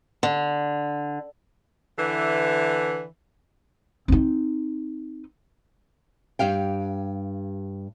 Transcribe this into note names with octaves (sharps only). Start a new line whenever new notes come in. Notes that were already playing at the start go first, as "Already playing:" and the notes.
D3
D3 E3
C4 D#4
G2 G4 F5 G5